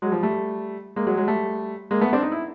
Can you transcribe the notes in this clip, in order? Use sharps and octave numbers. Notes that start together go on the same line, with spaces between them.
F#3 G#3
F3 G3
G3 A3
G#3 A#3
F#3 G#3
F#3 G#3
G3 A3
G#3 A#3
A3 B3
C4 D4
D#4
E4